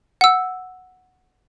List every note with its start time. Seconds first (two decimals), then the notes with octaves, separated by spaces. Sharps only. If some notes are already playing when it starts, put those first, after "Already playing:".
0.21 F#5 E6